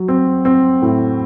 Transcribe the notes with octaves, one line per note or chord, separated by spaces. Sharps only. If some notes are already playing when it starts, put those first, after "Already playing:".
Already playing: F#3
C4
C4
A2